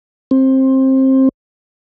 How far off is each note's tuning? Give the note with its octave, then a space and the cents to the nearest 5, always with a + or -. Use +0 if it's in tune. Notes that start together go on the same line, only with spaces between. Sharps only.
C4 +20